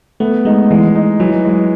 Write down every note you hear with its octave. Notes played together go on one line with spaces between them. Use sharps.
A3 B3
G#3 D#4
E3 G#3
D#4
E3 F#3
G#3